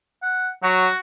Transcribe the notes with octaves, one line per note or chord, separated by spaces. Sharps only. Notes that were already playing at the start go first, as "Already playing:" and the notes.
F#5
F#3 F#4